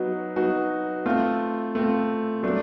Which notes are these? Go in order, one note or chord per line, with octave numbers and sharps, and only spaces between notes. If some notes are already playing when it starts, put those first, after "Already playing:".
Already playing: F#3 B3 D#4 F#4
F#3 B3 D#4 F#4
A3 C4 F4
A3 C4 F4
F#3 A3 D4